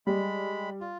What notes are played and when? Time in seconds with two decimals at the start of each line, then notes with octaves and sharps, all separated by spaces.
0.07 G3 G#3 B5
0.81 F4